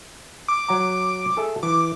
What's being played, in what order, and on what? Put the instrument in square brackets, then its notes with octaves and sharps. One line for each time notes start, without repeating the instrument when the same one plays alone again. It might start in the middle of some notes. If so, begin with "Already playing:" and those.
[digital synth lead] D6
[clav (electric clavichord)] F#3 F#5 A#5 [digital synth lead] D6
[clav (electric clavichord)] G#4 A4 E5
[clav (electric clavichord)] E3 [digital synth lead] D6